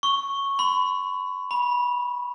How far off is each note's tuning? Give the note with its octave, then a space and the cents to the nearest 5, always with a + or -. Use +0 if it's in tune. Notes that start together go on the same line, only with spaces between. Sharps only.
C#6 -5
B5 +40
B5 -20